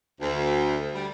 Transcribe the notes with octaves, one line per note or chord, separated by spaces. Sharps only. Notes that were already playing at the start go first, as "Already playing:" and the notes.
D2
G3